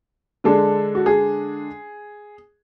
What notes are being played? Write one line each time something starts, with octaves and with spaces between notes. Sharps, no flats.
D3 G#3 D4 A4
F#4
G#4